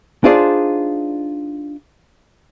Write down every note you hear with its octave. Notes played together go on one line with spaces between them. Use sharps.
D4 D#4 F4 G#4 C5 D5